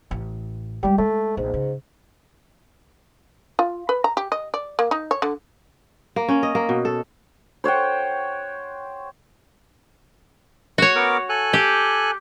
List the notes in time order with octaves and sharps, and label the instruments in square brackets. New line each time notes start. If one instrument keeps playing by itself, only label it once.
[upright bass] A1
[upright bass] G3 G#3 [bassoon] G4
[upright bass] G#3 [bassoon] A3
[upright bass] A#1 [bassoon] G#2
[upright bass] C#3
[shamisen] F4
B4
A#5
G4
D#5
D5
A#3
D#4
C#5
D3
[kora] A#3
C#4
D#5
A#3
B2
A4
[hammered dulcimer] C5 C#5 F#5 G5
[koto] F#4 C#5
[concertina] B3 A#4 D6
A4 G#5 F#6
[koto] G4